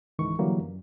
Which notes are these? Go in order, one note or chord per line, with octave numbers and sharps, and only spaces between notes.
C#2 G#2 D#3 E3 C#6
D3 E3 F#3 G3 A#3
F#2